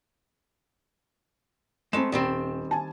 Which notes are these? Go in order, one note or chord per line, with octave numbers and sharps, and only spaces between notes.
G#3 A3 C4 B5 E7
D#1 D#3 G3 C4
G#5 A5